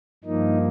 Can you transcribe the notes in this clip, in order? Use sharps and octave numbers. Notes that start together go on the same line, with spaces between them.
G2 F3 A#3 D#4